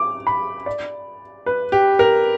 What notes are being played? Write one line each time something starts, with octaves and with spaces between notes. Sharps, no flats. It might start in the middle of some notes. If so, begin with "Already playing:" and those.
Already playing: D6
B5
D5
B4
G4
A#4